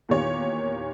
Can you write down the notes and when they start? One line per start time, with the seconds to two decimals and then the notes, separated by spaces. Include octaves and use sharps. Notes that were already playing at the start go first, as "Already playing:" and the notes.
0.09 E2 A#2 D#3 F4 G4 C#5